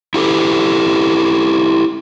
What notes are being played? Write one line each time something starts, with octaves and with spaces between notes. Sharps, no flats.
E4 G4 A4